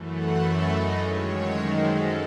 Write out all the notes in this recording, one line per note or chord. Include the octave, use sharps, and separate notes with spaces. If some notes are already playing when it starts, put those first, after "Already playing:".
Already playing: F#2 E3 A3
F#5
E5
D#5
F#2 D#3 G#3 C#5
C5
A4